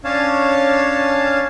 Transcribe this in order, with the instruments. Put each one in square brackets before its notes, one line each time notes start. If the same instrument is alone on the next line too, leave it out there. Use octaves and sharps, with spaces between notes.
[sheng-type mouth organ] C#4 D4 C#5 F5 A5